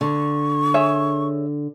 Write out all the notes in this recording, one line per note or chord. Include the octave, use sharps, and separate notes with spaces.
D3 C#6
G#4 C#5 E5